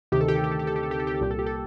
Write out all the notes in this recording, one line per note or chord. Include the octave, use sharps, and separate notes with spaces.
D2 C3 D#3 G4
A4
G4
A4
G4
A4
G4
A4
G4
A4
G4
A4
G4
A4
C2 A#2 G4
A4
G4
A4